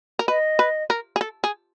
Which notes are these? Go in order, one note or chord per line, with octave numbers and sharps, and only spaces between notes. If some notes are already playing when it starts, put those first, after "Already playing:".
A#4
B4 D#5
B4
A#4
G#4
A4
G#4